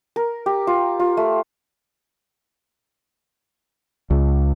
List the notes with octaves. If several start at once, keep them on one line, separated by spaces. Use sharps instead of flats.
A#4
G4
F4
F4
A3
C#2